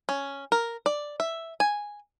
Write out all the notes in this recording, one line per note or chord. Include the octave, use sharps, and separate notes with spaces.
C#4
A#4
D5
E5
G#5